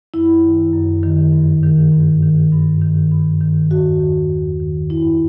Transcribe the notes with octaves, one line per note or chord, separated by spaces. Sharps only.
F#2 E4
D#3
F#2
D#3
G2
D#3
G2
D#3
G2
D#3
G2
D#3
E2 F#4
D#3
E2
D#3
F#2 E4